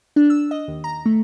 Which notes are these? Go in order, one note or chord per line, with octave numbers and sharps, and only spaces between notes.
D4
E6
D#5
D#2
A#5
A3